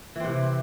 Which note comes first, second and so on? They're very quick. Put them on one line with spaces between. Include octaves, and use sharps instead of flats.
E3 C4 C3